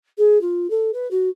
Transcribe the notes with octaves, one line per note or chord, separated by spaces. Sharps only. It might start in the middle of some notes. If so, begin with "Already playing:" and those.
G#4
F4
A4
B4
F#4